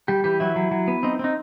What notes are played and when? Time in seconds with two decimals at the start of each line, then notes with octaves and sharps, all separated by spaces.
0.08 G3 G4
0.24 E3 G4
0.40 F#3 E4
0.56 F#3
0.71 F#3
0.88 B3
1.03 C4 D#4
1.19 C4 D#4